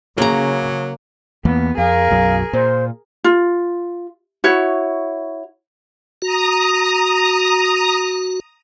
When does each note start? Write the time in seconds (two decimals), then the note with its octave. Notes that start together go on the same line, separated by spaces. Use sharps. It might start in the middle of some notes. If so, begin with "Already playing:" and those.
0.18 C#3 F#3 A#3 A#5
1.45 E2 E3 A#3 B3
1.78 F2 G#4 A#4 F5
2.10 B1 F#2 F#3
2.53 A#2 C5
3.24 F4
4.44 E4 F#4 C#5
6.22 F#4 A#5 D#6